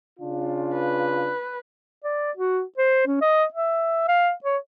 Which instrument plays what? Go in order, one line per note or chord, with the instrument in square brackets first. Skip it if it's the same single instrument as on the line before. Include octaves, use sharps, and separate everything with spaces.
[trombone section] C#3 D4 F4
[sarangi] B4
[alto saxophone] D5
F#4
C5
C#4
D#5
E5
F5
C#5